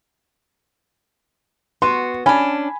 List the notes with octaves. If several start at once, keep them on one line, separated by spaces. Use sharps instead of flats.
B3 F#4 C6
C#4 D4 G#5 B5